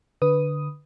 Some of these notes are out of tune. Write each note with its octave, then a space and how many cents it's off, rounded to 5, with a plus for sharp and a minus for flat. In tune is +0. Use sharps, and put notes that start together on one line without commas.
D3 +5 B4 +0 D#6 +0